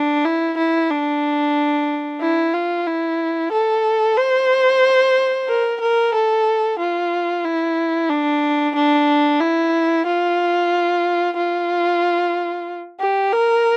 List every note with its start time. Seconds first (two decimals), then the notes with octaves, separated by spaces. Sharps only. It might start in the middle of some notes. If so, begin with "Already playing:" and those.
Already playing: D4
0.25 E4
0.58 E4
0.90 D4
2.21 E4
2.54 F4
2.87 E4
3.52 A4
4.18 C5
5.48 A#4
5.81 A#4
6.14 A4
6.79 F4
7.45 E4
8.10 D4
8.75 D4
9.40 E4
10.06 F4
11.37 F4
13.00 G4
13.33 A#4